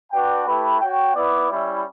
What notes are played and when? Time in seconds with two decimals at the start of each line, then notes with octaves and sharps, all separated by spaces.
0.11 D4 F#4 B4 D5 G5
0.46 A3 E4 G4 B4
0.80 F#4 C#5 G5
1.14 B3 E4 B4 D5
1.49 G3 C#4 E4